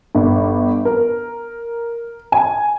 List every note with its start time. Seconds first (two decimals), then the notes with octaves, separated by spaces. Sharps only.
0.15 G1
0.85 A#4
2.32 G#5